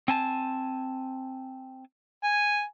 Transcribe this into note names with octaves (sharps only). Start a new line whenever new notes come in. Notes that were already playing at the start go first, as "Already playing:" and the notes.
C4 G#5 A5
G#5